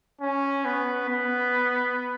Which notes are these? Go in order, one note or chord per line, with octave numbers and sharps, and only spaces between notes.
C#4
B3
B3